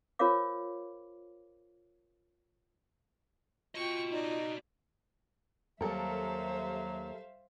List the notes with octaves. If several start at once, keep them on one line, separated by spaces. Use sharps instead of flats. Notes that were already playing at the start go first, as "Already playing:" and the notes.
F4 A#4 C5 C#5 F5 D6
F4 F#4 D#5 G5 C#6
D#4 D5
D#2 F#3 G3 A4 A#4 C5 E5 F5